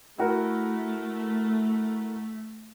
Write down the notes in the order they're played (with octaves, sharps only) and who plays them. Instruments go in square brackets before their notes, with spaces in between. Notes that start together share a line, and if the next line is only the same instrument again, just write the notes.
[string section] A3 [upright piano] E4 F#4 A#4